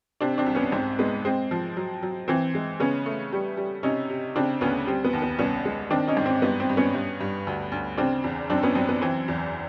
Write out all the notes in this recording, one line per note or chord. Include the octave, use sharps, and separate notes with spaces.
C3 C4 D4
C4 D4
C2
B3 C#4
G#2 C4
G#3 B3
G#3 C4
F3
F#3
F#3
E3 C4
G#3
C#3 B3 C#4
A3
G3
G3
C3 C#4 D#4
C3
C#3 C4 D4
D2 B3 C#4
G3 C4
B3
D#2
B3
C2 B3 C#4
G#3
D#3 C4 D4
C#4 D#4
G#2
C4
G2 B3
C4
G2
B3 C#4
G2
G2
D2
D2
C#3 C4 D4
E2
F#2 C4 D4
B3 C#4
F#2 C4
B3
E3 C4
E2